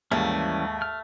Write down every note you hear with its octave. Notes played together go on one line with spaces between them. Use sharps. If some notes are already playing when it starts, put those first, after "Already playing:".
D#2 G#2 E3 G3 A3 A#3 C#4
F6